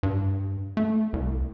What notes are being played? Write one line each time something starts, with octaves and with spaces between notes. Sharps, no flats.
G2
A3
C2